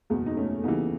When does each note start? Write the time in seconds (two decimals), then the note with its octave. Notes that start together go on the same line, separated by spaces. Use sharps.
0.10 F#1 E2 B2 G#3 B3
0.26 D#4
0.37 A3 C#4
0.64 D#2 C#3 E3 B3 D#4